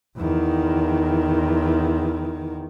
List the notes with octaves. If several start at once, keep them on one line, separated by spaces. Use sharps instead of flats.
E2 D#3